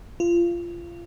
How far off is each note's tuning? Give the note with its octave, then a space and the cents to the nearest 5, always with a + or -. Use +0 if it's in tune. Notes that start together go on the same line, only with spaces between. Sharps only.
F4 -25